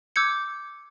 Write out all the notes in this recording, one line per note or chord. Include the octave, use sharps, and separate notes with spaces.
D6 E6 G6 G#6 C#7